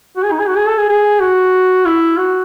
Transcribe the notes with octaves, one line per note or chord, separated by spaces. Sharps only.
F#4
G#4
D#4
G#4
F#4
G#4
A4
G#4
G#4
F#4
E4
F#4